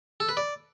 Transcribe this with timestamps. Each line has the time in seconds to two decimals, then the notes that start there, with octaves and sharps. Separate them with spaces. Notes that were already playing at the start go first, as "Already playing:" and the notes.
0.20 A4
0.29 B4
0.37 D5